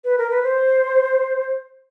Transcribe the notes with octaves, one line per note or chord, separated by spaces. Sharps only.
B4
A#4
B4
C5